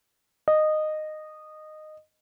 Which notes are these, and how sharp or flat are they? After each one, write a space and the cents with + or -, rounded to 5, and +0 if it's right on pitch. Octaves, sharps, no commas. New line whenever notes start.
D#5 -15